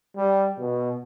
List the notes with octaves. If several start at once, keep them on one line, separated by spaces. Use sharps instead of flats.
G3
B2